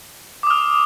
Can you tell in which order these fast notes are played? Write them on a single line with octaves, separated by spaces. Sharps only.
D6 D#6 F6